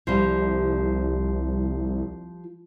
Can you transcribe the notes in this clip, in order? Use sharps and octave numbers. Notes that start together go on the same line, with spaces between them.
C2 F3 G3